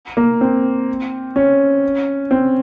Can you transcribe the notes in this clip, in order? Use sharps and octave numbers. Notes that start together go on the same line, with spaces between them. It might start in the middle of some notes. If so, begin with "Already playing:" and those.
A#3
C4
C#4
C4